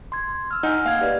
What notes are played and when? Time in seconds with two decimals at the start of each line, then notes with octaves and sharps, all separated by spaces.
0.12 C6 G#6
0.51 E6 F6
0.63 D#4 F#5 G#5 F6
0.86 A#3 F5 G5 G#6
1.01 G4 B4 D5